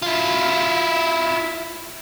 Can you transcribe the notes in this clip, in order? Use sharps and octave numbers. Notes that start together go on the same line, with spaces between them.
E4 F4